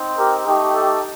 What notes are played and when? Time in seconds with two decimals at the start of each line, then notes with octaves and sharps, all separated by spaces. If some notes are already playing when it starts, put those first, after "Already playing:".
Already playing: C4 D#4
0.16 G4 A#4
0.45 A3 D#4 G4
0.73 A4